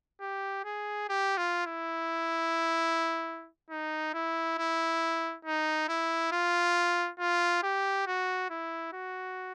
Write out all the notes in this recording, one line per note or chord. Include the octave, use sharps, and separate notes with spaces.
G4
G#4
G4
F4
E4
D#4
E4
E4
D#4
E4
F4
F4
G4
F#4
E4
F#4